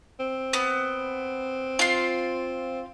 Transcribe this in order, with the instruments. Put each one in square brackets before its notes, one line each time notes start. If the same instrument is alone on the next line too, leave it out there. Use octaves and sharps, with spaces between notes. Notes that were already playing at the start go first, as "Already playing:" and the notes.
[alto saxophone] C4
[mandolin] B3
F4 C6